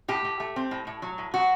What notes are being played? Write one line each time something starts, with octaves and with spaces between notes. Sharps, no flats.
A2 G4
A2
A3
C4
A2
A2
F#3
A2
F#3 F#4